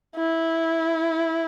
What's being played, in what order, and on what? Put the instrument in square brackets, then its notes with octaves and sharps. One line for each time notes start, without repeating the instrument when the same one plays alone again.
[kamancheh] E4